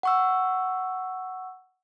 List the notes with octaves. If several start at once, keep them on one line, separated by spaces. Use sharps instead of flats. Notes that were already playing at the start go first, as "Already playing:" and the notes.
F#5 C#6 E6